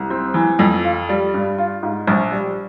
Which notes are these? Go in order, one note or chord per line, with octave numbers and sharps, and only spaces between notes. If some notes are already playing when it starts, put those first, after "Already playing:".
Already playing: C2
C4
E3
F2
F4
G3
G2
F4
G#2
A#1
G3